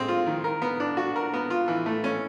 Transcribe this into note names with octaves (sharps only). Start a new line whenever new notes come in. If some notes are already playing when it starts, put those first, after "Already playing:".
Already playing: G#3 C4
F4
D#3
A#4
B3
D4
F#4
A#4
B3
F4
E3
A3
C#4